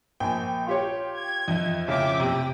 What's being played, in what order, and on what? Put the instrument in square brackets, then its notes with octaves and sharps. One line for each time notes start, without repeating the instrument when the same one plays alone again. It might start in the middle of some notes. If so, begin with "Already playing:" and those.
[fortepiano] A#1 G#5 [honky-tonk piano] G5
[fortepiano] F4 G4 C#5
[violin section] G#6
[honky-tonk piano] F2 [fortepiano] D#5 E5
[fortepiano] A1 [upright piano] C#3 [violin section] E5 G5 D6
[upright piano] C3 [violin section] G5